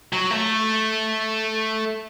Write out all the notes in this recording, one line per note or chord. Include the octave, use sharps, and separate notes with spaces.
F#3
A3